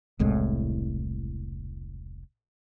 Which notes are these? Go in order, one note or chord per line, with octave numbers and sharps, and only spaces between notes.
E1 C2 A2 G#3